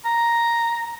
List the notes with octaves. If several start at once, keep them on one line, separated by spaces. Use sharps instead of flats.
A#5